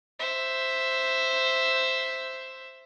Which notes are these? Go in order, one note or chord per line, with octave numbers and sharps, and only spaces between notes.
C5 E5